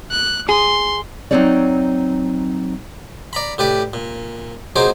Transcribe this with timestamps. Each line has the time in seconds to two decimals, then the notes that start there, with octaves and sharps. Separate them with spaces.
0.11 F#6
0.49 G#4 C6
1.31 F#3 G#3 C4 D#4 C#5 D5
3.33 D5 A#5 B5
3.58 A2 G4 B4 D5
3.93 A#2
4.76 A#1 F#3 D#4 G#4 C5 D6